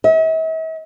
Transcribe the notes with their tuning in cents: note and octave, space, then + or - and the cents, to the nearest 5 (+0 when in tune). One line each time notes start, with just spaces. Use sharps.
E5 -45